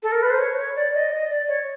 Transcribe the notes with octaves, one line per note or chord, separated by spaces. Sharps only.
A4
A#4
B4
C5
C#5
C#5
D5
D#5
D5
D#5
D5
C#5